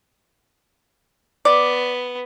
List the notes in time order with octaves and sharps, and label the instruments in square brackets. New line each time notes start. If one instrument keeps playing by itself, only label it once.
[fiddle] B3 [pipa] D5